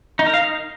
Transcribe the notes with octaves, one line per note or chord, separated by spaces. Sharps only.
D#4
A#4
F5
D#4